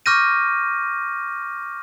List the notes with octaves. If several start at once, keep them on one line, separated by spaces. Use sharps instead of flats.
C#6 D6 F6 G6 A#6 D#7